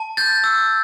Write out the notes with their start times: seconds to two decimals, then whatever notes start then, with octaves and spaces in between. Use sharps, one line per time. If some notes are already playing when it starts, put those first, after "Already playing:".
Already playing: A5
0.17 G6 A6
0.44 E6